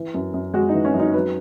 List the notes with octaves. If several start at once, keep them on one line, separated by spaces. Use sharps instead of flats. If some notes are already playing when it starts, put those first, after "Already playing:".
Already playing: E3
F#2
F#2
G#3 F#4
E3 D#4
C#4
F#2
D#4
F#3 B4